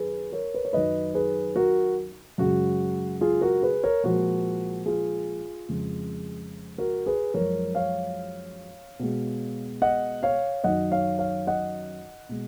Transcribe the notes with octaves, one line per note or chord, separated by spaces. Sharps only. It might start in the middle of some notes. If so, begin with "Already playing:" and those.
Already playing: F#2 D#3 G#4 B4
A#4 C#5
B4
C#5
F#2 D#3 F#3 B4 D#5
G#4 B4
F#4 A#4
F#2 C#3 G#3 F#4
F4 G#4
F#4 A#4
G#4 B4
A#4 C#5
A#2 F3 G#3 F#4 A#4
F4 G#4
F2 C#3 G#3
F#4 A#4
G#4 B4
F#2 F3 G#3 A#4 C#5
C#5 F5
B2 G#3
D#5 F#5
C#5 F5
F#2 D#3 F#3 D#5 F#5
C#5 F5
C#5 F5
D#5 F#5
B2 G#3